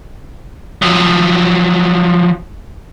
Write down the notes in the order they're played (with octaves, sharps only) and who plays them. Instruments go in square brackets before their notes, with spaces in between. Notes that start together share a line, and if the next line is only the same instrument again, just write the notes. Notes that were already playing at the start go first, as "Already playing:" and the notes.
[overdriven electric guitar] F3 F#3